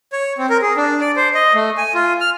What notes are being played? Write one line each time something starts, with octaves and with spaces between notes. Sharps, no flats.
C#5
C4
A#4
G#4
D4
D5
C5
D#5
A3
G#5
F4
F6